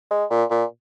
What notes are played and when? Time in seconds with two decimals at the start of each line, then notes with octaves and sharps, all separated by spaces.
0.11 G#3
0.30 A#2
0.51 A#2